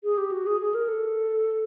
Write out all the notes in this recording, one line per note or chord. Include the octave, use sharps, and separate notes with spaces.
G#4
G4
F#4
G#4
G#4
A#4
A4